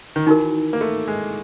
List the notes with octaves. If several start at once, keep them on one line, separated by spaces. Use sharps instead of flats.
D#3
E3 D#4 F#4 A#4
A#3
A3
G#3